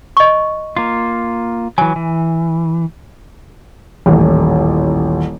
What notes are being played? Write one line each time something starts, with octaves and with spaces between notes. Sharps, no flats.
D#5 C#6
A#3 F4
E3 F#3 G#5
E3
D#1 A1